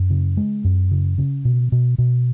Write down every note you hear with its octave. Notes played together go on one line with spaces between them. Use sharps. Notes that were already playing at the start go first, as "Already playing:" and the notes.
Already playing: F#2
C#3
G#3
F#2
C#3
C#3
B2
B2
B2